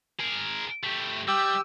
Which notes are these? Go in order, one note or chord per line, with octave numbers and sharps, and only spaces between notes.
G#4 A#4
A3 G4
G3 G4 E6